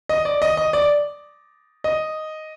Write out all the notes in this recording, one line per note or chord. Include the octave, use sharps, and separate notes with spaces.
D#5
D5
D#5
D#5
D5
D#5